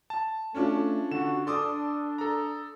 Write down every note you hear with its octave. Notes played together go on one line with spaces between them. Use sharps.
A5
A3 C#4 D4 F4
D3 F#4 E7
D4 A4 C6 D6 D#6
A4 A#5